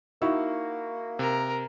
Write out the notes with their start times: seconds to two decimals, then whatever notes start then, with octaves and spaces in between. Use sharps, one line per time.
0.22 A#3 D#4 E4 F#4 E6
1.19 C3 A#4